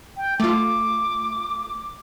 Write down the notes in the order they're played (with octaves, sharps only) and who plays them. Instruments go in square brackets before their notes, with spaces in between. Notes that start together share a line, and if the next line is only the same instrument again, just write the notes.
[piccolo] G5
[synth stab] A3 F4 [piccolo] D6